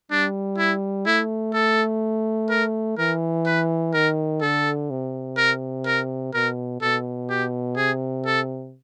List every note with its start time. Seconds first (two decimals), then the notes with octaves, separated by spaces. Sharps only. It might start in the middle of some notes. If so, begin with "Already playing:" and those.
0.11 G3 D4
0.58 E4
1.06 A3 E4
1.54 A4
2.50 A#4
2.98 E3 A#4
3.46 B4
3.94 D#3 A#4
4.41 D3 A4
4.90 C3
5.37 A#4
5.86 A#4
6.34 B2 A#4
6.81 B2 A4
7.30 G4
7.77 C3 G#4
8.26 A4